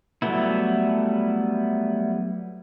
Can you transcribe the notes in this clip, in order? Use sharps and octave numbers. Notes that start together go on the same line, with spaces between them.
F#3 G3 A3 B3 E4